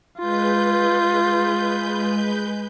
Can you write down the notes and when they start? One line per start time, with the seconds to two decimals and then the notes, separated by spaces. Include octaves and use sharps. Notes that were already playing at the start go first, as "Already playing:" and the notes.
0.19 G#3 F4 B4 G6